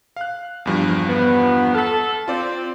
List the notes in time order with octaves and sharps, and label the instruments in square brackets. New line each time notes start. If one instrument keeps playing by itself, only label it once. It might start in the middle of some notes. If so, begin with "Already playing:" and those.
[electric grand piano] F5 F#6
E2 G2 F3
[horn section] B3
[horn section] A4 [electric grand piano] F6 B6
[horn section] C4 [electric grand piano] F4 D5